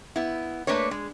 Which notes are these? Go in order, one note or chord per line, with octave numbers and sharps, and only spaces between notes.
B3 E4
A3 A#3 D4 B4 C#5
G#3